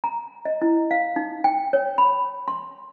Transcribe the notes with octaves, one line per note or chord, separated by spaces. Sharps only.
A#5
D#5
E4
F5
D#4
G5
C#5
B5
C6